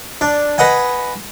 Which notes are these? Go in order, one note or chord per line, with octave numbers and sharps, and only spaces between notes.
D4
B4 D#5 F#5 G#5